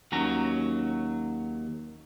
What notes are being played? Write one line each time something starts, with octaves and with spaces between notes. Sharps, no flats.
D#2 F#3 C#4 A#5